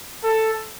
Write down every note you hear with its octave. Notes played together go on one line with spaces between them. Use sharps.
A4